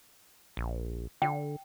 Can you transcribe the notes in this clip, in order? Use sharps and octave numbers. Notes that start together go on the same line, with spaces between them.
A#1
D3 G5